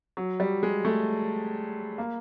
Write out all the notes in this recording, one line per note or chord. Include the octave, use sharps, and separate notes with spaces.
F#3
G3
G#3
A3
A#3